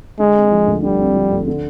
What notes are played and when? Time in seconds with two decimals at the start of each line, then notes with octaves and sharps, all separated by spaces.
0.19 D3 G#3
0.35 C4
0.52 F3
0.67 D2
0.83 D3 G3
0.99 C4
1.16 F3
1.31 D2
1.47 D3